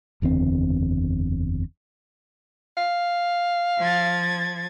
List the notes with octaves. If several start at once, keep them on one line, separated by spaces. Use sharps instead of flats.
F#1 E2 D3 C4
F5
F3 G#6 A6